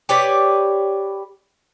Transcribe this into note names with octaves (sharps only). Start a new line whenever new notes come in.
G4 B4 C#5 D5